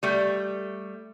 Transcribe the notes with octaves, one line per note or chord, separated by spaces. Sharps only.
G3 A3